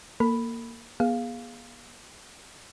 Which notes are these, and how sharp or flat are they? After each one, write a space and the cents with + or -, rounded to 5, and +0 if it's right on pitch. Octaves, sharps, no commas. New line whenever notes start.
A#3 +0 A4 +45 B5 +0
B3 -45 G#4 +0 F5 +0